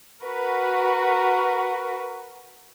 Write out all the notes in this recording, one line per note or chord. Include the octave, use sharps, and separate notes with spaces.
F#4 A#4 B4